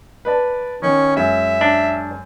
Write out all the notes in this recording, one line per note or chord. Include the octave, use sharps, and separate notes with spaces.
B4 D5 A5
D#3 C#4
F#2 G#3 E5
D4